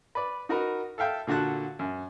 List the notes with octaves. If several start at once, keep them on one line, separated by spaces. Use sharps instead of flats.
B4 D5
D#4 F#4 A#4 B4
A4 E5 F5 G5 A5
A#2 D3 F#4 A5 F#6
F#2